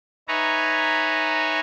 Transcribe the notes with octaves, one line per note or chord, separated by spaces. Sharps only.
D#4 B4 C#5 E5 G#5 A#5